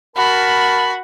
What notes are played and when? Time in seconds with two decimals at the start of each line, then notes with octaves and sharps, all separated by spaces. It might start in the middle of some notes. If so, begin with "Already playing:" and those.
0.16 F#4 A#4 A5 B5